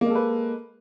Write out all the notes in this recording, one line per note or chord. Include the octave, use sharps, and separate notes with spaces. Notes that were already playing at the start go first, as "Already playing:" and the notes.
G#3 A#3 A4 B4